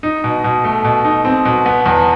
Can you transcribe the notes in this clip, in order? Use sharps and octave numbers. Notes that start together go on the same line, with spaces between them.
D#4
B2
B2
A3
B2
D#4
C4
B2
B3
E2